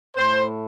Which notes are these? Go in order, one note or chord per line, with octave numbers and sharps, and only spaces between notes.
A2 A3 C5